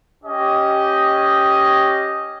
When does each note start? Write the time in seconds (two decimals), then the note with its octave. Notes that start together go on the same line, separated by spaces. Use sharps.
0.24 C#4 G4 D#5